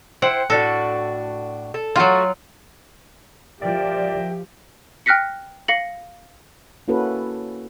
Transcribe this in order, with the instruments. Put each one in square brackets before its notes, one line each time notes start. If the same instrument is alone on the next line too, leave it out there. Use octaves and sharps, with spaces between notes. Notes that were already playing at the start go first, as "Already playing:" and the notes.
[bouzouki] E4 C5 G5 [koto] F#5
[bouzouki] A2 D4 F#4 [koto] A4
[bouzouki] A4
[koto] F#3 F4 [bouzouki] A3 F#4
[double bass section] F3 [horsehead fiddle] G4 [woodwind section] A#4 E5 G5 [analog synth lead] D5
[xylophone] G5 F6 F#6 A#6 B6 C#7
F5 A#6 C#7 F#7
[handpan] A#3 C#4 E4 F#4 A4 B4